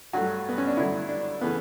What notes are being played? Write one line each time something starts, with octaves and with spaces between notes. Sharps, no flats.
G2 F#3 A3 F#4
B3
C#4
D4
G2 D3 F#3 A3 E4
D4
C#3 E3 A3 B3